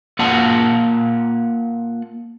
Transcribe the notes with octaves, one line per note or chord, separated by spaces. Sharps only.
A#3 F4 F#5 A5